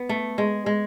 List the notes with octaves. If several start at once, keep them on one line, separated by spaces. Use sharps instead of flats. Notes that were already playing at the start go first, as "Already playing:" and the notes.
Already playing: B3
A3
G#3
G#3